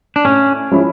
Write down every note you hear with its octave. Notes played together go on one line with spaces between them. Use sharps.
D4
A2 C#4
F3 G#3 C#4 E4